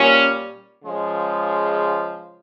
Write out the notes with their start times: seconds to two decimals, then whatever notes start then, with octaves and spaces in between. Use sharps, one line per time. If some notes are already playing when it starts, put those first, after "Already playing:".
Already playing: A#2 G3 C#4
0.85 C#3 F3 G#3